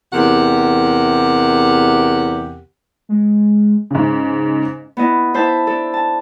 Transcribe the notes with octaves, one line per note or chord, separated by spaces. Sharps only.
E2 C3 G4 A#4 F#5
G#3
G#2 C#3
B3 E4 D#5
E4 C5 E5 A5
D4 A4
A5